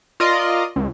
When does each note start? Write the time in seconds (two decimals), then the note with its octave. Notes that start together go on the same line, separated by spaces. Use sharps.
0.20 F4 A#4 D5 D#5
0.76 C#2